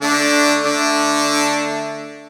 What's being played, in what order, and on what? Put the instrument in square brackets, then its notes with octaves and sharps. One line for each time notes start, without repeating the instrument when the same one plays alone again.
[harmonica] D3 D4 [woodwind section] A3
[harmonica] D3 D4